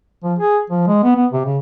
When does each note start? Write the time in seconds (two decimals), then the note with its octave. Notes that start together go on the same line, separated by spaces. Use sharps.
0.24 F3
0.39 G#4
0.70 F3
0.88 G#3
1.03 B3
1.16 B3
1.32 C3
1.46 C#3